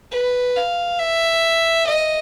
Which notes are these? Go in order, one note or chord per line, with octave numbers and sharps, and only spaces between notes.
B4
F5
E5
D#5